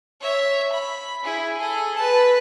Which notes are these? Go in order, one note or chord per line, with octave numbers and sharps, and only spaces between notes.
C#5 E5
B5
E4 G#4
G#4 A4
B4 A5